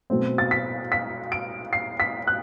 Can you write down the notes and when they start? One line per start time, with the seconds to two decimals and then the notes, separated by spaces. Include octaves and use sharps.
0.10 B2 F#3 A3 C4
0.38 A6
0.51 B6
0.92 B6
1.32 D7
1.73 C7
2.00 B6
2.27 F#6